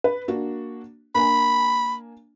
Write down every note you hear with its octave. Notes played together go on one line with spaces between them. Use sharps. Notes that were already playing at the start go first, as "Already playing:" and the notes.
B4
A#3 D4 F#4
A#3 D4 G#5 B5